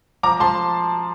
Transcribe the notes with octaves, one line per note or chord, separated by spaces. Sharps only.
F3 A#5 D6
F3 A5 C6